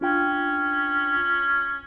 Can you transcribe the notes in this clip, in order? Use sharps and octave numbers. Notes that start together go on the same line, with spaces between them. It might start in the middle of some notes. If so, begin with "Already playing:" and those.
C#4 D4 F4 G5